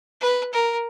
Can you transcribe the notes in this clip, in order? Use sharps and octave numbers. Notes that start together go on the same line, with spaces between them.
B4
A#4